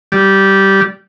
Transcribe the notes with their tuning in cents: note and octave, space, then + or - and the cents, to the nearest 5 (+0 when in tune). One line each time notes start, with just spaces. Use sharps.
G3 -10